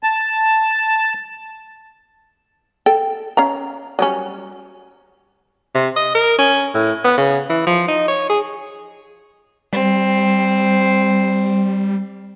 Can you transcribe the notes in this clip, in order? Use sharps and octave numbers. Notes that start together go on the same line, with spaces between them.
A5
A4 G5
C#4 F5 A#5
F#3 G3 C#4
C3
D#5
A#4
C#4
A2
B3
C#3
E3
F3
D#4
C#5
G#4
G3 C4